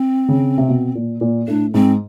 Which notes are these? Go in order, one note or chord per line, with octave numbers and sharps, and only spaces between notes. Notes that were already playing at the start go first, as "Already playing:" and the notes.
Already playing: C4
C#3
C3
B2
A#2
A#2
A2 D4
G#2 C4